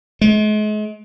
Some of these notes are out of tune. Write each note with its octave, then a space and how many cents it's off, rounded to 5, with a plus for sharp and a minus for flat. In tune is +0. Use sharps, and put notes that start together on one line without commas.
G#3 +40